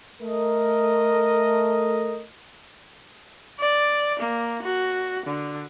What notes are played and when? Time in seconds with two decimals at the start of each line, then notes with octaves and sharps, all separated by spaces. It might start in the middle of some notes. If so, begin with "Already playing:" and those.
0.22 A3 A#4 D#5
3.60 D5
4.20 A#3
4.63 F#4
5.27 D3